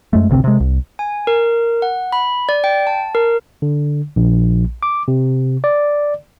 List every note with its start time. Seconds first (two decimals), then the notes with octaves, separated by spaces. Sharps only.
0.13 F#2 G#3 A3
0.29 A1 D2 C3 C4
0.44 C3 G#3
0.60 C2
0.99 G#5
1.27 A#4
1.82 F#5
2.12 B5
2.49 D5
2.64 G5
2.87 A5
3.15 A#4
3.62 D3
4.16 A#1
4.83 D6
5.08 C3
5.64 D5